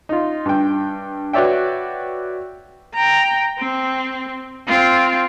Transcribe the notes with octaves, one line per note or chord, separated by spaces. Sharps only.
D#4 F4
G2 G5
F#4 B4 C#5 D5 E5 G5
G5 A#5
C4
C4 F4